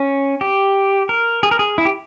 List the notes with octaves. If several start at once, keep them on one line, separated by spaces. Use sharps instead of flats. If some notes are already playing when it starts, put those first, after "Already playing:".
Already playing: C#4
G4
A#4
G#4
A#4
G#4
E4
G4